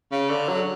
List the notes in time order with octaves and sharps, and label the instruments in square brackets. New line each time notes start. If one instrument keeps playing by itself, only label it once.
[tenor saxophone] C#3
D3
F#3